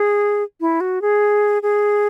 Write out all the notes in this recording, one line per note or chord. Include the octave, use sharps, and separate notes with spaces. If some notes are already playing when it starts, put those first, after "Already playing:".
Already playing: G#4
E4
F#4
G#4
G#4